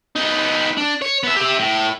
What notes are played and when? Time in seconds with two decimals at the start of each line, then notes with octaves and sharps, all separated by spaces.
0.16 B3 D#4
0.77 D4
1.02 C#5
1.23 B3 E5
1.37 G4 E5
1.59 A2